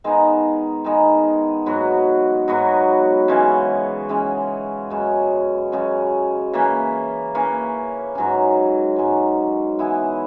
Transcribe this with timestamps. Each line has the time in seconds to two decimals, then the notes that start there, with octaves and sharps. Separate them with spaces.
0.04 D#3 G#3 B3 D#4
0.84 D#3 G#3 B3 D#4
1.66 G#2 F#3 B3 F#4
2.48 G#2 F#3 B3 F#4
3.28 C#3 E3 G#3 C#4
4.09 C#3 E3 G#3 C#4
4.90 F#2 C#3 G#3 C#4
5.72 F#2 C#3 G#3 C#4
6.53 E3 A#3 C#4
7.35 E3 A#3 C#4
8.15 G#2 F#3 C#4
8.96 G#2 F#3 C#4
9.79 E3 B3 E4 G#4